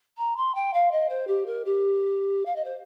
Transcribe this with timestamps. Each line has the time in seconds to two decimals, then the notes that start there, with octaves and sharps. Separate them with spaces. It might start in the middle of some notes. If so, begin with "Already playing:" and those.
0.18 A#5
0.36 C6
0.55 G5
0.73 F5
0.91 D#5
1.09 C5
1.27 G4
1.46 A#4
1.65 G4
2.45 F5
2.56 D#5
2.64 C5